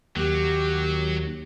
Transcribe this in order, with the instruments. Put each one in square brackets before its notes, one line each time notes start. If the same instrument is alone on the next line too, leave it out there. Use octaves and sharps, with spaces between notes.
[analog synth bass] D#2 [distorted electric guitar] F#3 [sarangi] G4